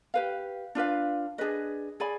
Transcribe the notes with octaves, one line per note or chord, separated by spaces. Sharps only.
G4 B4 F5
D4 F4 B4 F5
D4 G#4 B4 D#5
G#4 D5 G#5 B5